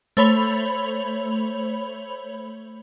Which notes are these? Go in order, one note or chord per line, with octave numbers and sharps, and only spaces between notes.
A3 C5 C#5 B5 F7